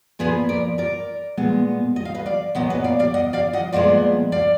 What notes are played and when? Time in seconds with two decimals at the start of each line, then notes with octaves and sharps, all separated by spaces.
0.19 A#2 F3 B3 G#4 B4
0.49 A#4 D5
0.78 A#4 D5
1.37 A#2 G#3 B3
1.96 D#5
2.05 F5
2.14 B4 D#5
2.26 D5 F5
2.55 A#2 F#3 B3 D#5 F#5
2.70 B4 D#5
2.84 D5 F5
2.99 D5 F5
3.14 D#5 F#5
3.33 D5 F5
3.53 D#5 F#5
3.73 A#2 F3 G#3 B3 D5 F5
4.32 D5 F5